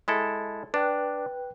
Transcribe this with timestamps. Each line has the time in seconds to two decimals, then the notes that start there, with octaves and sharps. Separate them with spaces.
0.08 G#3 E4 A4
0.74 D4 B4 G5 F#6